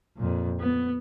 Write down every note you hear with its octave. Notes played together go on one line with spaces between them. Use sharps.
F2 A#2
B3